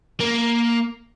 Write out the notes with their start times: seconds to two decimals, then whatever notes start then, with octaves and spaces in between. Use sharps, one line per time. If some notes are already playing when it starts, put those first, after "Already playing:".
0.20 A#3